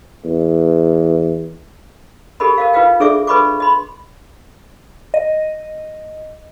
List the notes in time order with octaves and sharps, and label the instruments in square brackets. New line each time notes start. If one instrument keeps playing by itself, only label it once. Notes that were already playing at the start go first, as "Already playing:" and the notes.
[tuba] E2
[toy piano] G4 A4 A#4 D#5 B5
A#4 D#5 F5
F4 B4 D#5 F5 G5
D4 G#4 A4 D5 E5 D6
A4 B4 D#5 B5 C#6 D6
D#5 B5 C6
[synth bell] D#5